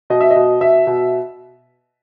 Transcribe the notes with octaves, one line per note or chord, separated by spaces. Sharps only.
B2 D#5
E5
D#5
B2
B2 E5
B2